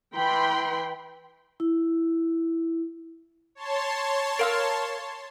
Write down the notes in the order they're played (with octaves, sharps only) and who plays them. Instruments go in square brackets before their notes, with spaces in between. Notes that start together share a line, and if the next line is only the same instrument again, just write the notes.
[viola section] E3 G5 B5 C6
[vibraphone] E4
[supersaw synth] C#5 A5 C6
[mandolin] A#4 F5 E6